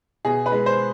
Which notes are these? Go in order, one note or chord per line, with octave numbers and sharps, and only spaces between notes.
B2 G#4
B4
G#3
C5